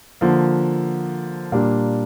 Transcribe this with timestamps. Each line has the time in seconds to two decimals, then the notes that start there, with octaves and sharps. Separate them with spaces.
0.21 D3 F3 A#3
1.52 A#2 G3 A#3 D4